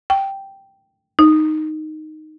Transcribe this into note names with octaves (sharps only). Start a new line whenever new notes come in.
G5
D#4